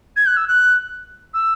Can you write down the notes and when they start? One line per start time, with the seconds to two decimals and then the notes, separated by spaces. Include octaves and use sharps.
0.16 G#6
0.26 F#6
0.37 E6
0.48 F#6
1.34 E6